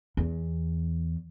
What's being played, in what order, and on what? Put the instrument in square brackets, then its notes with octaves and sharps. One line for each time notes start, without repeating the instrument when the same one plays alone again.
[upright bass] E2